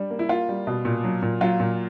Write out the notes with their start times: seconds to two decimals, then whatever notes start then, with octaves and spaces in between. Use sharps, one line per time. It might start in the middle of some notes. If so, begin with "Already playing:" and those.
Already playing: G3 D4
0.10 A#3
0.19 E4
0.29 A#3 F4
0.49 G3
0.67 B2
0.85 A#2
1.04 F#3
1.22 A#2
1.41 F#3 F4
1.60 A#2